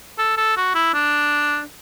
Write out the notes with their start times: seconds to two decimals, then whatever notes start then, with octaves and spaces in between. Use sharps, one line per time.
0.18 A4
0.37 A4
0.56 F#4
0.75 E4
0.94 D4